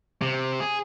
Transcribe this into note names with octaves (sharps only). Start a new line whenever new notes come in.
C3
G#4